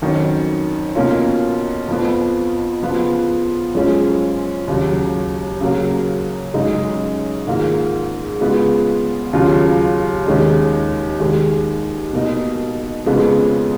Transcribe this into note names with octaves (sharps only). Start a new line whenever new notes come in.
F2 D#3 F#3 C#4
B2 A#3 C#4 F4
F2 F3 B3
C#3 F3 B3 F4
F#2 F3 G#3 C#4 F4
D#2 C#3 F#3
C#3 F#3 A#3
F#2 C#3 G#3 D#4
G#2 D#3 A#3 F4
C#3 G#3 B3 F4
D#2 C#3 F#3 C#4 F4
D#2 D#3 G#3 C#4
D#2 D#3 G#3
B2 A#3 D#4
F2 C#3 G#3 B3 F4